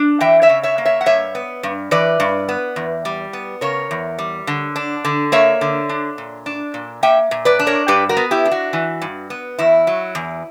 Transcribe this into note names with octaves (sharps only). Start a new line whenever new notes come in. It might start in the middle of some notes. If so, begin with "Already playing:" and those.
Already playing: D4
E3 E5 G5
C#5 E5
C#3
C#5 E5
A#3
C#5 E5
F#5
G2 C#5 E5
B3
G2
E3 B4 D5
G2
B3
E2
G3
B3
C#3 A#4 C#5
E2
G3
D3
D4
D3
A#3 C#5 E5
D3
D4
A#2
D4
A#2
A#3 E5 G5
A#2
B4 D5
D4
A#4 C#5
G2 G4 B4
F#4 A#4
B3
E4 G4
D4
F#4
E3
G2
B3
E2 E4
F#3
E2